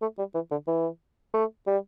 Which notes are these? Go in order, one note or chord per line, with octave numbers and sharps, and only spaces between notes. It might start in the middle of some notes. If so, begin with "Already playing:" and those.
A3
G3
E3
D3
E3
A3
G3